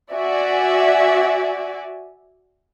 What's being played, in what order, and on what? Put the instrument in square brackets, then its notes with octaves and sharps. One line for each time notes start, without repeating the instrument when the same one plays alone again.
[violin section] F#4 D5 E5 G#5